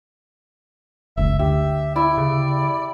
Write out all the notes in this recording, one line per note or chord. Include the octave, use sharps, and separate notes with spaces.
F#1 C#2 E5
D2 G4 E5
E4 D5
C#3